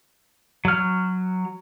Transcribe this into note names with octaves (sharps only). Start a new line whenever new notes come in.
F#3 F6